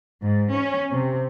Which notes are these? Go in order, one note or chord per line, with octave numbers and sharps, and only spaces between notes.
G#2
C#4
C3